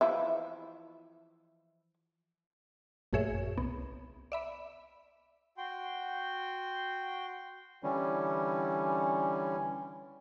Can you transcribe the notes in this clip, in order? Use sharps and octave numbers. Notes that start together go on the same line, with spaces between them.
E3 F3 E4
A1 F#2 A#2 G#4 C#5 E5
C2 B3
D5 E5 B5
F#4 G5 C6
D3 E3 G3 C#4